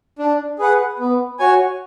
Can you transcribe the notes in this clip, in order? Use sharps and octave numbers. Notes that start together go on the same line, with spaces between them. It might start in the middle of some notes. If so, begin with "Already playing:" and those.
D4
G#4 B4 F#5
B3
F#4 C#5 G#5